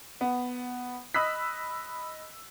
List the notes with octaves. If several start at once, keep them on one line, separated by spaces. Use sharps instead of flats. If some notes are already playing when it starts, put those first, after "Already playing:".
B3
D#5 B5 D#6 E6 F#6 B6